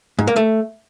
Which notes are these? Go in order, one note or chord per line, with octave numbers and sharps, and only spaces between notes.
G#2
A#3
A3